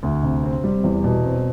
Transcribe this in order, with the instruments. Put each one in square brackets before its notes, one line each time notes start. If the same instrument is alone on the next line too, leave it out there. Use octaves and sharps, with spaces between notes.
[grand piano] D2
C3
C4
G3
E2
B2
C4